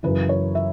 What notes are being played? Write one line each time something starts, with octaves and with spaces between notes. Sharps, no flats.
F#2 C#3 E3 B4
C#5
E5